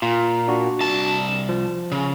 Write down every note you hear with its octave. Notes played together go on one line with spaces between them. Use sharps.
A#2 F4
D4 F#4
C2 A5
F3
C#3